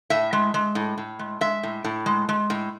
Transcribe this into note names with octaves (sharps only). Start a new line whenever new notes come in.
A2 E5
G#3
G#3
A2
A2
G#3
G#3 E5
A2
A2
G#3
G#3
A2